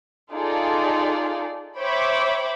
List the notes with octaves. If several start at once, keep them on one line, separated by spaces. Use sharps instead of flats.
D#4 F4 G#4 A4 D5
C5 C#5 E5 G5 B5 D6